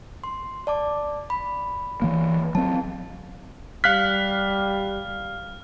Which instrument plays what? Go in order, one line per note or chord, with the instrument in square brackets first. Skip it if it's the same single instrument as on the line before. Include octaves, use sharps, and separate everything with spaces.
[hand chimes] C6
D5 A5 D6
B5
[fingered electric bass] E3 A#3
[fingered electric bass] F#3 C4 [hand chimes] A5
[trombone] G3 [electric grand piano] F5 F#6 B6 [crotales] F6